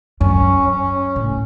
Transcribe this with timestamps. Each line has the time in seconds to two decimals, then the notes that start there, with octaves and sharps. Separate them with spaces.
0.21 F#2 C#4
0.69 C#4
1.16 A2